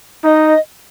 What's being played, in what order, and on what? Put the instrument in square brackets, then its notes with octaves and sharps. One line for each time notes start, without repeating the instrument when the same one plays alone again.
[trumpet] D#4 [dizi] D#5